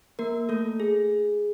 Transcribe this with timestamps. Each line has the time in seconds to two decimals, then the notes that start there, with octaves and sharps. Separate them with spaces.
0.19 A#3 A#4
0.49 A3 A4
0.80 G#4